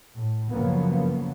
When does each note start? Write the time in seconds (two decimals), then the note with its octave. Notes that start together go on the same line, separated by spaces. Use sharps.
0.16 A2
0.50 F#2 C#3 F3 F#3 A#3 B3